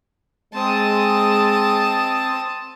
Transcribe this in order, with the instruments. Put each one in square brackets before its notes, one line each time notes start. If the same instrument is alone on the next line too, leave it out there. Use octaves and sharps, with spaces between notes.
[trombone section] G#3 [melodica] C4 [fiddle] A5 D#6